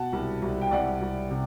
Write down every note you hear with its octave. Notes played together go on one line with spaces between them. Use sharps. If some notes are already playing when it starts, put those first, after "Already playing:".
Already playing: B2 F#5 A5
C2
C2
G5
C2 D5 F#5
C2
C3